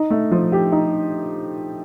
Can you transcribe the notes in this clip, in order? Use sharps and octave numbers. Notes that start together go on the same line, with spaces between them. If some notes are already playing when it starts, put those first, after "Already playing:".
Already playing: D#4
A3
F3
G4
D#4